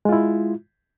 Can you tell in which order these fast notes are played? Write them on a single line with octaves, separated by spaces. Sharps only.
G#3 F4 E4